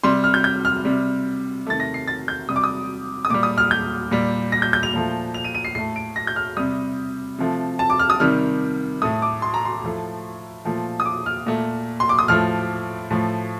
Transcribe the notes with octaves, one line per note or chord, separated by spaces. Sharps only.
C3 G3 C6
F6
G6
G6
F6
C3 G3
C3 D#3 A3 A6
A#6
C7
A6
G6
C3 G3 D#6
D6
D#6
D#6
A#2 G3 D6
D#6
F6
G6
A#2 G3
A#6
G6
G6
F7
A#2 F3 A3
F7
D#7
D#7
C7
A2 A3 C7
D7
A#6
G6
F6
C3 G3 D#6
C3 F3 A3
A5
D6
F6
D#6
C3 D#3 G3 F6
A2 A3 D#6
D6
C6
A#5
C6
A2 F3 A3
A#2 F3 A3
D#6
D6
F6
A#2 A3
C6
D6
D#6
A2 F3 A3 F6
A2 F3 A3